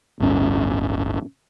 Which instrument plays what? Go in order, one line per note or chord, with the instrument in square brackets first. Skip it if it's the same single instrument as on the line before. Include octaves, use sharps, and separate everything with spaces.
[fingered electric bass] D1 G1 C#4